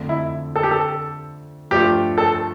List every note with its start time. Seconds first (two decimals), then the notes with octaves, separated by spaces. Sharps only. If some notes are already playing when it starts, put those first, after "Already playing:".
Already playing: F2 D3 A3 D4
0.09 E4
0.56 A4
0.63 G4
0.71 A4
1.71 G2 F3 A3 D4 F4 G4
2.18 A4